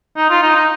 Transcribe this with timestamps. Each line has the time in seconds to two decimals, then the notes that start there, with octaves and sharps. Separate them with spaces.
0.17 D#4
0.30 F4
0.42 D#4
0.56 D#4